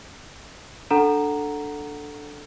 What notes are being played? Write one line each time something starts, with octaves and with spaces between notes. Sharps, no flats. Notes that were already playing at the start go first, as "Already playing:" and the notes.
D4 A4 F#5 A#5 E7